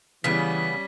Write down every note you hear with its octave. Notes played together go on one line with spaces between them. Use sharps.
C#3 E3 G3 B3 C#4 B6